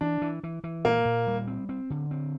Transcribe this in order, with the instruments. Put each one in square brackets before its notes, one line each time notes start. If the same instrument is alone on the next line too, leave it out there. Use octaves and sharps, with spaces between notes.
[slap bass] E3 [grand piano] D4
[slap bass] E3
E3
E3
[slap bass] A#2 [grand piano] A#3
[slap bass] A#2
G3
C4
C4
D3
C4